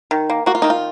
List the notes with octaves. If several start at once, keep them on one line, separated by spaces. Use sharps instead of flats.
D#3
A#3
A#3 F#4
F4
D#3 D#4
F4